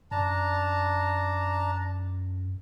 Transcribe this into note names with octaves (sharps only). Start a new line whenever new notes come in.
F#2 D4 A5 A#5